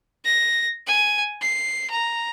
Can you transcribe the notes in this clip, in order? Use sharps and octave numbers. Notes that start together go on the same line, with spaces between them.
A#6
G#5
C7
A#5